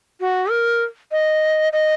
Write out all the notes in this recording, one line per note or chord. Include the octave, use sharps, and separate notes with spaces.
F#4
A#4
D#5
D#5